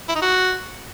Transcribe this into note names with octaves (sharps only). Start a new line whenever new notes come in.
E4
D#4
F#4